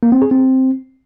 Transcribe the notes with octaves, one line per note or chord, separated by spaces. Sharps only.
A#3
C4
G#4
C4